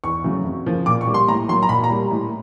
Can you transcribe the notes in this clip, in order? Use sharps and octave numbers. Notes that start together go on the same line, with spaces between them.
E2 C#6
C#3 F#3 A3
F2
C#3 F3 A#3
A#2 D6
C#6
G3 A#3
C6
A2 A#5
F#3 A#3 C6
A#5
A#2 B5
A#5
G3 A#3
A2